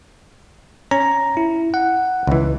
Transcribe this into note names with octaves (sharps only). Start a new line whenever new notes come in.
C#4 A#5
E4
F#5
C#2 E3